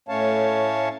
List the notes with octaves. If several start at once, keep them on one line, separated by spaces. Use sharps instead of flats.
A2 A3 C#4 C#5 F5 A5